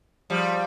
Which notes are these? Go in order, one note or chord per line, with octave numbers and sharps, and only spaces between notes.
F3 G3